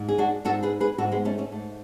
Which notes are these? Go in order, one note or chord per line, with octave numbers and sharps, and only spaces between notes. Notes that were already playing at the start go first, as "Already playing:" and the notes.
Already playing: G#2
G#4
D4 F#4
G#2 F#4 A4
G#4 B4
G#4 B4
G#2 F#4 A4
G#3 B3
A3 C#4
A3 C#4
G#2 A3